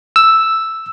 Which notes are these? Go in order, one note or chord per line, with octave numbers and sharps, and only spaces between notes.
E6